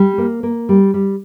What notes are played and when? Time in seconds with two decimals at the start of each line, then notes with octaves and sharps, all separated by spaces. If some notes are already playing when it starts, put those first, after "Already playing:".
Already playing: G3
0.18 A#3
0.43 A#3
0.69 G3
0.94 G3